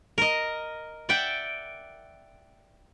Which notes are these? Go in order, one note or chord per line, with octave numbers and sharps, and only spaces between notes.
A#4 D#5
D5 E5 F#5 G5